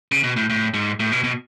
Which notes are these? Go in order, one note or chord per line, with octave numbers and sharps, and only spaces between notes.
C#3
B2
A2
A2
G#2
A2
B2
B2